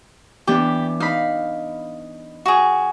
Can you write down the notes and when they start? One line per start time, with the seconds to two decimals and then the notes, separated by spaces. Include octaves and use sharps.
0.47 E3 B3 D4 G4
1.00 D#4 F5 B5
2.46 F#4 G#4